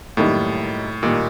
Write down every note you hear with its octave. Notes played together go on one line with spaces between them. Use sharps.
F#2 A2 D#3 G3 A#3 D#4
A#2 D#3 G3 A#3 D#4